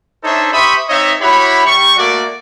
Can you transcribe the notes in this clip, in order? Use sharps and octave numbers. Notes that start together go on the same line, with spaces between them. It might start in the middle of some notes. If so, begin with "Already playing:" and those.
D4 D#4 A4 C5 C#5 E5
G4 C5 E5 B5 C#6 D#6
C4 D#4 C#5 D#5 E5
E4 F#4 G4 C#5 B5
G3 C#6
A3 A#3 F#4 D5